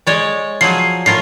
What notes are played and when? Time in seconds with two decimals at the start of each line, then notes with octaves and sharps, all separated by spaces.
0.07 G#3 C#5 D5
0.61 F3 F#3 G#4 C7
1.06 A2 F4 A#4 C7